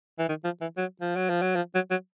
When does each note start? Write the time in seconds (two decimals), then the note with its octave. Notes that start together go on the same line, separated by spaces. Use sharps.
0.19 E3
0.29 D#3
0.45 F3
0.61 E3
0.77 F#3
1.01 F3
1.16 F#3
1.29 F3
1.42 F#3
1.56 F3
1.75 F#3
1.91 F#3